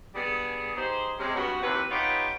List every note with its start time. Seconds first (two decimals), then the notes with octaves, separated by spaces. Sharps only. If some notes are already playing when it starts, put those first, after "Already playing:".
0.15 G3 B3 D4 G#4
0.77 D#4 G4 G#4 C5
1.18 C3 G#3 C#4
1.35 G2 C3 B3 F#4
1.62 D#2 C3 E3 B4
1.91 B3 D#4 F4 G4 B4 C#5